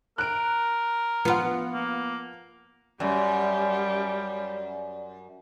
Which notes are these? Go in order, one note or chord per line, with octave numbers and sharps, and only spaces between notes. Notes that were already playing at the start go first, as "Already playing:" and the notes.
A#4 F#6 D7
F3 B3 F4 F#5
A#3
F#2 G3 D5